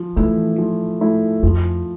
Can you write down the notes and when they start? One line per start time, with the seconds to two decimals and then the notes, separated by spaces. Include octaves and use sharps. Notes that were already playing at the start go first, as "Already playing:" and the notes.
Already playing: F3
0.16 E3 A3 E4
0.58 F3
1.01 A3 E4
1.43 F2 F3